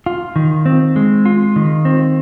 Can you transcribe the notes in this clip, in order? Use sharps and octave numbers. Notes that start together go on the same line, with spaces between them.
F4
D#3
C4
G#3
F4
D#3
C4